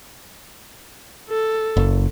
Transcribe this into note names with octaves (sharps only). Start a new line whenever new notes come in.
A4
F#1